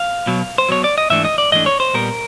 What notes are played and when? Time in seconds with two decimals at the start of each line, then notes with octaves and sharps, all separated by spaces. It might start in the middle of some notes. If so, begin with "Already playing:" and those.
Already playing: F5
0.26 B1 B2 F#3
0.58 C5
0.69 B1 B2 F#3 C#5
0.84 D5
0.98 D#5
1.10 G#2 E3 A3 D4 E5
1.25 D#5
1.38 D5
1.52 G#2 E3 A3 D4 D#5
1.66 C#5
1.80 C5
1.94 A#2 G3 B3 A#4